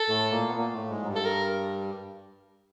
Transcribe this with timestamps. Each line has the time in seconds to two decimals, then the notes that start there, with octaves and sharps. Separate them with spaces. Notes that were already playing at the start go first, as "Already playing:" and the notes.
Already playing: A4
0.09 A2 A3
0.31 A#2 A#3
0.49 B3
0.55 A#2 A#3
0.73 A2 A3
0.90 G#2 G#3
1.02 F#3
1.07 G2 G3
1.16 A4
1.25 A#4